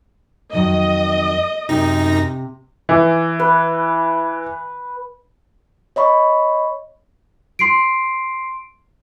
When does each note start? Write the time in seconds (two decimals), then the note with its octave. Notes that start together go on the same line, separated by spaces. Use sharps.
0.53 F2 D#3 F#3 D#5
1.69 F#2 C3 D#4 A#6
2.89 E3
3.39 B4
5.96 C#5 D#5 B5 C#6
7.59 C6 C7 D7